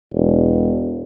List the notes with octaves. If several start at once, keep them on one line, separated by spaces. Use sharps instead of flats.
E1